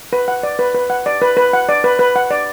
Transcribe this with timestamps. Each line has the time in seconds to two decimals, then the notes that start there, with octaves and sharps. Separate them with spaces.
0.13 B4
0.28 F#5
0.43 D5
0.59 B4
0.75 B4
0.90 F#5
1.06 D5
1.22 B4
1.37 B4
1.53 F#5
1.69 D5
1.84 B4
1.99 B4
2.16 F#5
2.31 D5